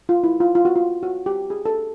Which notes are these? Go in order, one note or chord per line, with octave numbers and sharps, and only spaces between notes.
F4
E4
F4
F4
F#4
F4
F#4
G4
G#4
A4